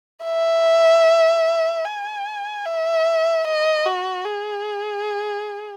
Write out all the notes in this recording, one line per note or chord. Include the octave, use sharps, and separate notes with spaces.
E5
G#5
E5
D#5
F#4
G#4